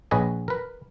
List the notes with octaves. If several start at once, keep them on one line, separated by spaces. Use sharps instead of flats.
A#1 G#4 B4 C#5 D#5 G#5
A#4 B4